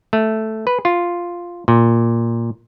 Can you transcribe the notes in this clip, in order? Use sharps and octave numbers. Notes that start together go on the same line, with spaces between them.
A3
B4
F4
A#2